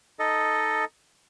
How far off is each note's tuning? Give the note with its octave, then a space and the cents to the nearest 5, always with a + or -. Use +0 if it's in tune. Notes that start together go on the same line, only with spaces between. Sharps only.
D#4 +0 A4 +0 D#5 +0